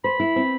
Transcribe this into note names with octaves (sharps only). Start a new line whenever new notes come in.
C5 B5
E4
C4